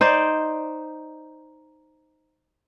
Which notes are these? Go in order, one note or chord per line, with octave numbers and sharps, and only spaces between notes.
D#4 C5 D5